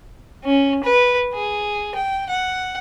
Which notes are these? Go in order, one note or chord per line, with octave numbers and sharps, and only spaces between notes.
C#4
B4
G#4
G5
F#5